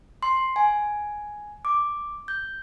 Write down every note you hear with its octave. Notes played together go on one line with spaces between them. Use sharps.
C6
G#5
D6
G6